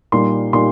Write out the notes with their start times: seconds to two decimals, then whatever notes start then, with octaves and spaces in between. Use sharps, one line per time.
0.12 A#2 G3 A#3 D#4 C6
0.53 A#2 G3 A#3 D#4 C6